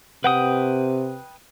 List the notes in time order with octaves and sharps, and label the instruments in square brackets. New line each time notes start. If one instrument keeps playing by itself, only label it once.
[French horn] C3 [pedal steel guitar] B4 G5 D#6 [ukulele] F#5